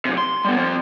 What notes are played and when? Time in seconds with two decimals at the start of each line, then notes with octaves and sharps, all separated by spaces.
0.05 F#2 C3
0.18 C6
0.45 G3 B3
0.57 F3 C4